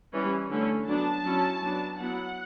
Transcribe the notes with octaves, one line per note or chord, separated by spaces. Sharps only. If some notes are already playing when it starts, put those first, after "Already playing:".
E3 G3 C#4
D3 A3 C#4 E4
F#3 B3 D4 A5
F#3 C#4 E4
F#3 B3 D4
F#3 B3 E4 F#5